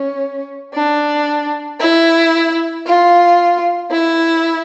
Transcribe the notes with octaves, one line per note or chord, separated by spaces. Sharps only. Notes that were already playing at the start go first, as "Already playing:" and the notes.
Already playing: C#4
D4
E4
F4
E4